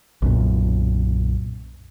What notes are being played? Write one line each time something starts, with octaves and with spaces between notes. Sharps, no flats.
B1 F#2 A#2